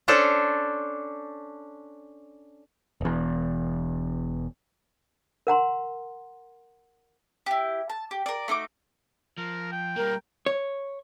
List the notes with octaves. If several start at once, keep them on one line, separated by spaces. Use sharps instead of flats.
C#4 D4 A4 C5
E1 E2
A#4 F#5 A#5 C6
E4 G4
A5
G4
A#4 D5
A3 D#4 F#4 D6
F3 A#4
G5
G3 A#3 A#4
C#5